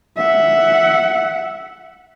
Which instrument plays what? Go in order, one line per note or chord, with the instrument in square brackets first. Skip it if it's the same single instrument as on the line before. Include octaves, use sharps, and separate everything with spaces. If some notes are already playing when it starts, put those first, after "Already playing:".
[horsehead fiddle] E5 F#5